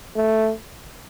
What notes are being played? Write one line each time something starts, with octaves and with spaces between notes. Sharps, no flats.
A3